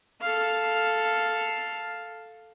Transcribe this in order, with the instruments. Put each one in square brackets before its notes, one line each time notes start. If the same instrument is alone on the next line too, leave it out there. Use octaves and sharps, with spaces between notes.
[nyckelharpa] A4 F5